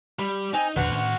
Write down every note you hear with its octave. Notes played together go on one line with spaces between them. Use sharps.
G3 B5
C4 D#4 G#5
E2 B2 D#3 B3 D4 F#4 C5 F#5
A2 D#3 C#4